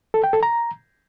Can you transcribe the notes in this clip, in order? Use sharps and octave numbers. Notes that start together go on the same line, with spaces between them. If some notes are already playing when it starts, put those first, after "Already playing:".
A4
G5
A4
A#5